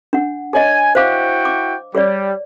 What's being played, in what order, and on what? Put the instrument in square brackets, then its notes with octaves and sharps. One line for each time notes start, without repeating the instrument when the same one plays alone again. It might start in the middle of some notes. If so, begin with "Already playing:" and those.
[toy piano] D4 F#5
[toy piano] G#4 C#5 D#5 [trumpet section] G#5
[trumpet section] E4 F#4 G5 [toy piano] C5 F5 D6
[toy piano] D6
[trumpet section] G3 [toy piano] G#4 C#5 D5